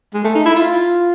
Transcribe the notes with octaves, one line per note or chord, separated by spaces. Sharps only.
G#3
A3
D#4
E4
F4